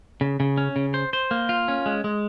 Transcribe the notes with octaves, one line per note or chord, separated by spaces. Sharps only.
C#3
C#3
C#4
C#3
C5
C5
A#3
F4
C#4
G#3
G#3